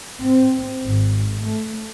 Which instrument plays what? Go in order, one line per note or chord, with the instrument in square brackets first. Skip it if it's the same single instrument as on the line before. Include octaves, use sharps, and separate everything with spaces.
[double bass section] C4
G#1
A3